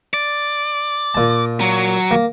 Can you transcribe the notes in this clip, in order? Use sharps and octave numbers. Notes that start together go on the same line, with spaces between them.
D5
A#2 A5
F#3
A#3